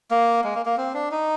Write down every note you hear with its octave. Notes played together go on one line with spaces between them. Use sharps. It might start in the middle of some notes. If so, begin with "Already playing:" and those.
A#3
G#3
A#3
A#3
C4
D4
D#4